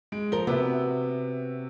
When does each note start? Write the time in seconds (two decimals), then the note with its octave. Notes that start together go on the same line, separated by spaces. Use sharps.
0.12 G#3 D7
0.32 F3 A#4 G7
0.47 C3 B3 F#4 E5